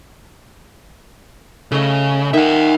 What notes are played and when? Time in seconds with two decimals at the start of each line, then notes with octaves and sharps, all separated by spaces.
1.72 C#3 A3 D#5
2.33 D#3 D#4 E5 F#5 G#5